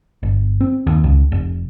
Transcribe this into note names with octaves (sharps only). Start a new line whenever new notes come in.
G1
C4
D#2
C#2
F1